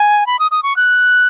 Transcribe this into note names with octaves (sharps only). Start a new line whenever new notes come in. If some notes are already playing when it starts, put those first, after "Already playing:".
Already playing: G#5
B5
D#6
D#6
C#6
F#6